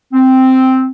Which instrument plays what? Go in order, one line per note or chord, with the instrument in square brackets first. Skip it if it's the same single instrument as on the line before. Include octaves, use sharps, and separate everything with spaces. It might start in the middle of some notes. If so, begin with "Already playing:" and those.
[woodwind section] C4